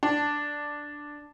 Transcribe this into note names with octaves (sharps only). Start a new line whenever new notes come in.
D4